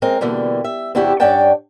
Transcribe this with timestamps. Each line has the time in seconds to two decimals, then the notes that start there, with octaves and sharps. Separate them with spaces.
0.02 G#3 C4 A#4
0.21 B2 D3 E3 G3 A#3
0.64 E5
0.95 E2 C3 D4 E4 F#4 G4
1.20 G2 C#4 D5 F#5 G5 A5